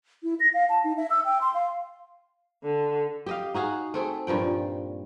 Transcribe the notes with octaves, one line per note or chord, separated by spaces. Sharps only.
E4
A#6
F5
A5
D#4
E5
E6
G5
C6
F5
D3
G4 D#5 F5
D#4 F#4 G#4 F5
A3 C4 G#4
G2 A#2 F3 G5